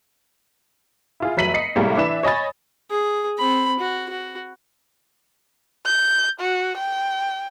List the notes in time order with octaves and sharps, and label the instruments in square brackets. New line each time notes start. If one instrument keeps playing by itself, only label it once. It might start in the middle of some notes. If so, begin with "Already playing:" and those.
[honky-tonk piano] E4 F4 G#4
F1 F#3 E5 B6 D#7 F#7
D#5 C7 C#7
A2 C3 G3 G#3 A#3
E3 D4 B4 E5 E7
C#5 D#5 G#5 B5 A6
[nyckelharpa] G#4
C4 B5
F#4
F#4
[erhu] G6
F#4
G5